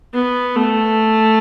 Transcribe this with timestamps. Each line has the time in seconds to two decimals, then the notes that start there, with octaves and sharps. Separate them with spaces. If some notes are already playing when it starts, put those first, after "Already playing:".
0.14 B3
0.56 A3